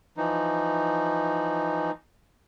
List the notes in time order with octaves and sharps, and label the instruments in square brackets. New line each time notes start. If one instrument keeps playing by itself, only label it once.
[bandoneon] E3 F3 D#4